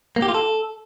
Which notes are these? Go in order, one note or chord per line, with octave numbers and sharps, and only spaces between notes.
A#3
G4
F4
A4